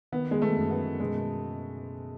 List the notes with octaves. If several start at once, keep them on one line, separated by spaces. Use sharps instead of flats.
D#3 B3
G#3
A3
F#2
B3
B2 G#3